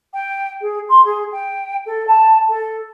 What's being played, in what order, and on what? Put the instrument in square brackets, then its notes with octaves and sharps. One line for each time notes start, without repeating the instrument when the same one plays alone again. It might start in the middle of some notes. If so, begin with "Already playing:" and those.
[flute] G5
G#4
C6
G#4
G5
A4
A5
A4